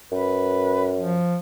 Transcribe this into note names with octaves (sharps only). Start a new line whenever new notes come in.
F#2 B4
F3